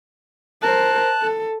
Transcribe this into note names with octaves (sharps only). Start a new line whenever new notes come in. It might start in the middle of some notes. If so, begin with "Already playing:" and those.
A#4 C5 A5 F#6
A4